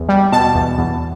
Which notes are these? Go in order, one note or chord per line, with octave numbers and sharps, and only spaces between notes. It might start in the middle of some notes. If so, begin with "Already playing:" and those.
Already playing: E2
G3
B2 A5
E2
E2